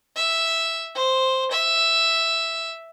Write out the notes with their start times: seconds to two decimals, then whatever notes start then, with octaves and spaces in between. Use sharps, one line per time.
0.16 E5
0.95 C5
1.51 E5